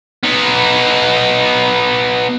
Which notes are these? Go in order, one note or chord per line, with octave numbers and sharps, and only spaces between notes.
B3 D#4